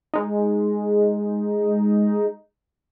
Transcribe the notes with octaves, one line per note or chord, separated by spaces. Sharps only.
G#3 D#4